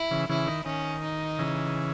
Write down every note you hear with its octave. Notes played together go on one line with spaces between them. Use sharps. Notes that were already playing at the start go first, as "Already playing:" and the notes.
Already playing: E4
C#3 E3
C#3 E3 E4
D#3
D#3 C#4
D#4
C#3 E3